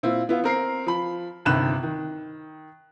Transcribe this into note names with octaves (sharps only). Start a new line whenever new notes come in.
A#2 C4 E4 F4
B3 E4 F4
C4 A#4 C7
F3 B5
G1 C3 D#3 B5 F#6 E7
D#3